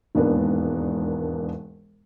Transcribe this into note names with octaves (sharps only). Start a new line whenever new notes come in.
E1 D#2 G#2 B3 D4 A#4